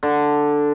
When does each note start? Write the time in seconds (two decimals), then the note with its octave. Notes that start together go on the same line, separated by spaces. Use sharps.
0.03 D3